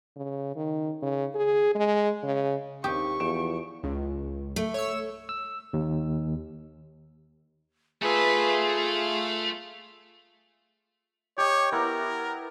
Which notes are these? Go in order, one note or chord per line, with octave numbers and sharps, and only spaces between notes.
C#3
D#3
C#3
G#4
G#3
C#3
D#2 C4 G4 C#6 D#6
E2 F3 D7 E7
C#2
A3
C#5 E6
E6
D#2
A3 F4 G#4 B4 E5
F5
G4 C#5 D#5
B3 E4 A#4 A#5